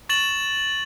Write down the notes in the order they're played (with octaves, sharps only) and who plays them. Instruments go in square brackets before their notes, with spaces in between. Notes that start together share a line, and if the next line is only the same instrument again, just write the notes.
[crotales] C#6 A6 E7 F#7